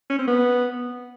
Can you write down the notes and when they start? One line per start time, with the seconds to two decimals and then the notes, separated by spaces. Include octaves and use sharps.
0.10 C#4
0.18 C4
0.27 B3